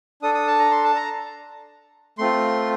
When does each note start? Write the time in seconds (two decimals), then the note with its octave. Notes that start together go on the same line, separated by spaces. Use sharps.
0.22 D4 A4 D#6
0.34 D#6
0.47 A5
0.59 A#5
0.71 C6
0.84 A5
0.96 A#5
2.18 A3 C4 F4 C6